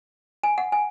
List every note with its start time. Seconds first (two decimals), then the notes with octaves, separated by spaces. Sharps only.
0.43 G#5
0.58 F#5
0.72 G#5